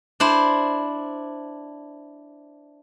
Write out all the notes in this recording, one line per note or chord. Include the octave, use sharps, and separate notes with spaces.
D4 E4 C5